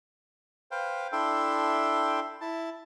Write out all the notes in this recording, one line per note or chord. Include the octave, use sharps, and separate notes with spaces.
B4 C5 F5 G5
D4 E4 A4 E5 G5 C6
E4 A5